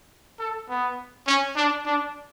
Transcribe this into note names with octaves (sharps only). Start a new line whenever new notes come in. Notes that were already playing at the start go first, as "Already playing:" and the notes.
A4
B3
C#4
D4
D4